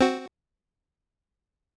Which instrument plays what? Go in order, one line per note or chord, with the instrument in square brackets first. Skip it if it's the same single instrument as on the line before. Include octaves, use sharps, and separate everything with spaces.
[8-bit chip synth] C4 F#4